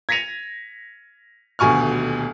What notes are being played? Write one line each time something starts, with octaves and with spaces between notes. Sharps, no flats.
G#6 A#6 B6 C#7 D#7 F7
D#1 D2 B2 G#5 C#6 F6